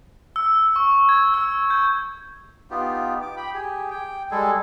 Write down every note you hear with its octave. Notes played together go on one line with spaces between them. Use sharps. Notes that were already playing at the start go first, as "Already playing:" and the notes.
E6
C#6
G#6
E6
G6
B3 D#4 F4 G4
D6
G5 B5
G4 G#4
G5
G3 G#3 G#4 A4